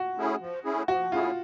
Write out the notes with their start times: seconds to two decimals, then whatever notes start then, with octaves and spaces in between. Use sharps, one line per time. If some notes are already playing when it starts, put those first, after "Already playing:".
Already playing: F#4
0.17 A3 C#4 E4 G#4
0.40 F3
0.64 A3 C#4 E4 G#4
0.88 F3 F#4
1.12 A3 C#4 E4 F4 G#4